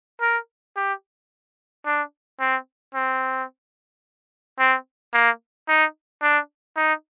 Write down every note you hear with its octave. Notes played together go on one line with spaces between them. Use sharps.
A#4
G4
D4
C4
C4
C4
A#3
D#4
D4
D#4